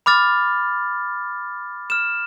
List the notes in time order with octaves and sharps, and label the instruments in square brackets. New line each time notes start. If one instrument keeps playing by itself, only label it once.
[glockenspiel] B5 D6 F6 A6
F6 E7